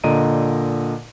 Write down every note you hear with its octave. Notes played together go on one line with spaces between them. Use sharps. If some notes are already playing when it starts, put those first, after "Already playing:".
A#2 D3 D#5 A#5 D7 D#7